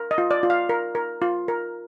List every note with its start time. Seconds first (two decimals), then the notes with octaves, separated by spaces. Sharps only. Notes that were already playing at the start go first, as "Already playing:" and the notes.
Already playing: A#4
0.11 D#5
0.18 F4
0.31 D5
0.43 F4
0.50 F5
0.69 A#4
0.95 A#4
1.22 F4
1.48 A#4